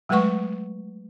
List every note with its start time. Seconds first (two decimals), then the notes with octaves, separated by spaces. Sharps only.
0.09 F#3 G#3 A3 B4 F#5 C#6